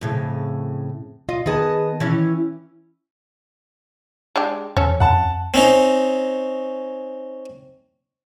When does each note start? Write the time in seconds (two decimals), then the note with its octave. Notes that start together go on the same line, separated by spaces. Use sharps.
0.01 F2 A2 C#3
1.29 F4 D#5
1.46 D#3 B3 G#4 D#5 A5
2.00 E3 C#4 E4
4.36 G#3 D4 G4
4.77 E2 C#4 A4
5.00 F2 F#5 A5
5.54 C4 C#4 D#4